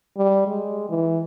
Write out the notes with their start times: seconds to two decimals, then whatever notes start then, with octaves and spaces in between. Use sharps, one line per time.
0.17 G3
0.47 G#3
0.89 E3